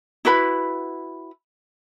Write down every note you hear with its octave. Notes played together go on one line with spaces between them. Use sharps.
E4 F#4 B4 B5